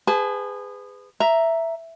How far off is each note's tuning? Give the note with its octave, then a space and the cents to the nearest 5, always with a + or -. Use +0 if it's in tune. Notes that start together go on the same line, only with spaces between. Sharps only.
G#4 -25 B4 +30 A5 -40
E5 +5 A#5 +0